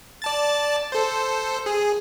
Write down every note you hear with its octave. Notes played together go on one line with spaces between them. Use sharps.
D5 A5 A6
A4 C5
G#4